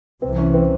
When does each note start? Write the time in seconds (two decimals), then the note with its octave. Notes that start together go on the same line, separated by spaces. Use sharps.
0.22 C2 C3 E3 C4
0.38 C#4
0.54 C4